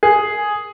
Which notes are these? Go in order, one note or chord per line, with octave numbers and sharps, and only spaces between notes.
G#4